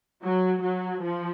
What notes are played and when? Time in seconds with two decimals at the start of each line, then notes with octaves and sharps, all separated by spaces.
0.23 F#3
0.62 F#3
1.02 F3